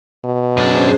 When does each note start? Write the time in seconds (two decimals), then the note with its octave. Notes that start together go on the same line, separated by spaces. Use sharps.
0.24 B2
0.57 F#2 C#4 D4 G#4 C5